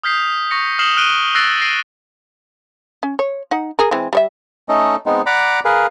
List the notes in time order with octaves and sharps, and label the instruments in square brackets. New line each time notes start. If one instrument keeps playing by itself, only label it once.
[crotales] D#6 F6 G6 B6 C7
C#6 A#6 C#7
D#6 F6 C7 E7 F#7 G7
F6 F#6 D7 D#7 G7
E6 F#6 A6 A#6 C7 D7
A#6 C7 D7 D#7
[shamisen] C#4
C#5
D#4 F#5
G#4 A#4
E3 G#3 C4
G3 C#5 E5
[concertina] A3 C#4 D#4 A4 D#5
G#3 B3 C4 D#4
D5 F#5 A#5 B5 D6
G#4 A#4 B4 F5